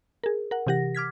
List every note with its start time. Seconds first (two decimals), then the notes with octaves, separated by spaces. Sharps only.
0.24 G#4 A#4
0.51 A#4 F#5
0.67 C3 E3 G4 F#5 A#6
0.95 D6 F6 G#6 B6